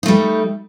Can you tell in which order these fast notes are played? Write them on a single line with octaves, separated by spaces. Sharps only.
D#4 A3 G3